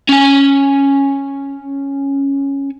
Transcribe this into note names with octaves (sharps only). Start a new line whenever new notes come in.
C#4 G#5